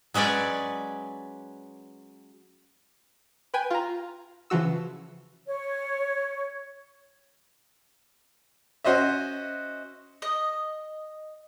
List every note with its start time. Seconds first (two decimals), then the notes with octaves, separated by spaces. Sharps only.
0.14 F#3 G#3 C#4 B4 D5
3.54 B4 G5 G#5
3.70 F4 A#5
4.50 C#3 E3 F3 F#4 E6
5.48 C#5
8.84 C#4 F#4 C5 D#5 E5
10.22 D#5